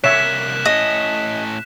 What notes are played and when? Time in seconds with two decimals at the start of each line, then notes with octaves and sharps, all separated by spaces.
0.04 C2 A#3 C#5 E5 F#6 B6 E7
0.65 A2 C#4 D#5